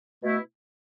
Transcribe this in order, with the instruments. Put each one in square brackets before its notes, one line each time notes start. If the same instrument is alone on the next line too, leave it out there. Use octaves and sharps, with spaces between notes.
[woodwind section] B2 A3 E4